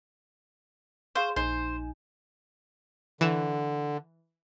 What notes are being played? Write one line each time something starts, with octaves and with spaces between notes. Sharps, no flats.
G#4 C5 F5 C#6
A#1 D#4 C5 G#5
D3 E3 E7